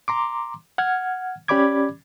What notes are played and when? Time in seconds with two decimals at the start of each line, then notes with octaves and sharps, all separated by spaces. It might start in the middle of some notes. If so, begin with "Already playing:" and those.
0.08 A#5 C6 D6
0.78 F#5 F6 G#6
1.48 C#4 G4 D5 B5 D6 G#6